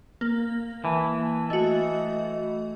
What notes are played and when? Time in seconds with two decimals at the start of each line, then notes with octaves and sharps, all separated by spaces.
0.21 A#3
0.85 E3 A5
1.50 A3 F#4 D#5